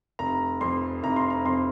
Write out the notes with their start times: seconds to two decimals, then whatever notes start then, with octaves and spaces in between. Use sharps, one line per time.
0.19 F1 A#5
0.61 F2 C6
1.03 F1 A#5
1.16 C6
1.30 A#5
1.45 F2 C6